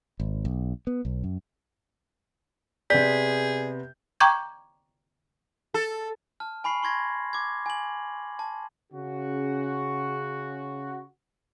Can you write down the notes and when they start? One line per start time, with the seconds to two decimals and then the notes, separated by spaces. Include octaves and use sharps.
0.20 G#1
0.45 B1
0.87 B3
1.05 B1
1.24 F#2
2.90 C3 B3 G#4 D5 G6 B6
4.20 G5 A#5 C#6 D6 G6 G#6
5.74 A4
6.40 A5 F6
6.64 G#5 B5 C#6 C7 F#7
6.83 C6 C#6 G#6 A#6
7.33 D6 G#6
7.66 G#5 F#7
8.39 A5
8.93 C#3 F#4